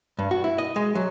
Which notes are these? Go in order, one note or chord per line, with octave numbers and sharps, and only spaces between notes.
G2
F#4
E4
D#5
G#3
F#3